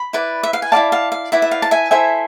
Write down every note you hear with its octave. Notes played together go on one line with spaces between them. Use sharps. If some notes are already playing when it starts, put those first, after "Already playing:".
Already playing: B5
E4 B4 D5
E5
F5
G#5
E4 B4 D5 F5 A5
F5 A5
F5
E4 B4 D5 E5
E5
F5
A5
E5 G#5
E4 A4 C5 E5 G#5